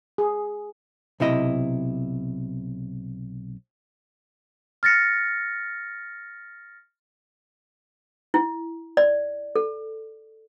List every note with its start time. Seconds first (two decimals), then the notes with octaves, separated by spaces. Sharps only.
0.18 G#4
1.20 B1 C3 E4 D#5
4.83 F6 A6 A#6 C#7
8.34 E4
8.97 D5
9.56 A4